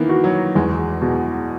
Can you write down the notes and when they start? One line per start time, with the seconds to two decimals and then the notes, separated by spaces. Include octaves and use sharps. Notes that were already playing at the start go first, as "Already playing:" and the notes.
Already playing: D#3 E3 A#3 B3
0.09 F#4
0.24 F#3
0.55 E2 G#3
1.02 B2